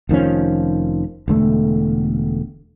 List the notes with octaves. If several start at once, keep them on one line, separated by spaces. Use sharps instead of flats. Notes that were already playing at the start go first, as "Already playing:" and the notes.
F1 D#3 F3 C#4
E1 D3 A3